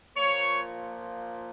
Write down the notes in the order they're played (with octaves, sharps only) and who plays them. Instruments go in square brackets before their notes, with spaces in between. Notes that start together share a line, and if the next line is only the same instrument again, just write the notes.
[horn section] A#2 F3 A#3 C#5